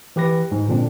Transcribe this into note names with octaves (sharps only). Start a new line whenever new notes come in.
E3 G4 B4 A#6
G#2
A#2 D3 C4 D4